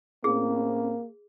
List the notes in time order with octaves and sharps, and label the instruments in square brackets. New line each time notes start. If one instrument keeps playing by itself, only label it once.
[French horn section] A2 C4 C#4 [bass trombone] A#3 [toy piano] G#4